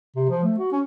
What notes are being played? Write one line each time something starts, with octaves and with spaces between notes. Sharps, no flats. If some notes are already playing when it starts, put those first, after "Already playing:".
C3
F3
A3
F#4
C#4